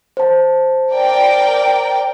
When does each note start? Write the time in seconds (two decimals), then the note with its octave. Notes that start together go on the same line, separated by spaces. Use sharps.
0.17 C5 A5
0.91 A#4 D5 G5